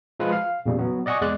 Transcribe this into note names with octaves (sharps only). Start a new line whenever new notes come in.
F3 G#3 F4 B4
F5
E2 A#2 C#3 G3
F#3 B3
D5 D#5 F#5 G#5 C#6
E2 G#3 D5 F#6